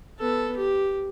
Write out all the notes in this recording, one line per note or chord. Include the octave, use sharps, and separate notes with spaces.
B3 A4
G4